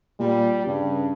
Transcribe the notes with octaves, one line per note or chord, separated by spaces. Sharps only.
A#2 G3
G2 C#3